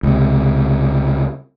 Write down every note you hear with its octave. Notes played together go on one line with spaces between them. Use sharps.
C#2 C3